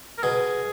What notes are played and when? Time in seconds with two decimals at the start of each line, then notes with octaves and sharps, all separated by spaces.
0.18 A#4
0.23 B2 G#4